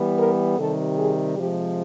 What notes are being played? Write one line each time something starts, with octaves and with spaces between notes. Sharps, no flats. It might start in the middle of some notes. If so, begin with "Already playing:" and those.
Already playing: E3 G3 B3
A#4
C3 D#3 G3 A4
G#4
C3 F3 G#3 G4